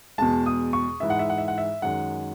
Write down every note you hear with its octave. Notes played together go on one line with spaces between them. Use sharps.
E2 B2 G#3 A5
D#6
C#6
G#2 E3 G#3 E5
F#5
E5
F#5
E5
F#5
E5
F#2 D#3 G#3 F#5